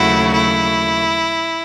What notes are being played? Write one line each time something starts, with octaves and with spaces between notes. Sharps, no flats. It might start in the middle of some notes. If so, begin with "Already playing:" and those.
Already playing: D#2 C#3 F#3 A3 E4 F#4
E4